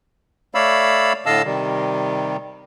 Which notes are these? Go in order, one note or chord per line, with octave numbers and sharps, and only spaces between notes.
A3 C#5 D5 F5 B5 E6
A2 D3 D#5 F5 A5 E6
C3 D#3 G3